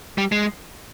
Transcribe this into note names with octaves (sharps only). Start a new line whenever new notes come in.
G3
G#3